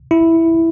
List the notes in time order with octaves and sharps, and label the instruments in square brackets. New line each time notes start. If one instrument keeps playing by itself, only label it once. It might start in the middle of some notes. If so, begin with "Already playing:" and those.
[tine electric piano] E4